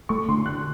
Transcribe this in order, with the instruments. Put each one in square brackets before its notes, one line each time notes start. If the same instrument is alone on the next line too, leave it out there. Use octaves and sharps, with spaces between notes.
[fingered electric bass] A3 [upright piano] C#6
[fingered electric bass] D3 [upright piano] C6
[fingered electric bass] D3 [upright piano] F#6